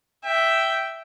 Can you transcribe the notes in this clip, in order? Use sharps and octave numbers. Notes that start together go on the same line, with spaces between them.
E5 G5